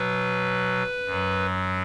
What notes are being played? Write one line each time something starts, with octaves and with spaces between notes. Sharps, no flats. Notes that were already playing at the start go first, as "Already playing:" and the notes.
Already playing: B2 F#3 B4
F#2 F#3